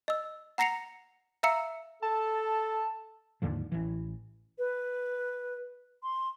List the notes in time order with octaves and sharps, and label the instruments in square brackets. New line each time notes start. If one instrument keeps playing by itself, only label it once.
[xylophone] D#5 E6
F#5 A#5 A#6 C7 C#7 F7
E5 F5 A#5 E6 C#7
[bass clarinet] A4 [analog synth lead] A5
[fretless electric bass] D#2 G#2 D3 F3
A1 E3
[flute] B4
C6